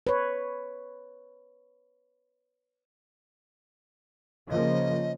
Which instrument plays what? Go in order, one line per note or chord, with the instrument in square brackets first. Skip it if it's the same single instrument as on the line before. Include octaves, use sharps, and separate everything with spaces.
[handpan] B4 C#5
[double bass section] C#3 F3 A#3 [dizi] D#5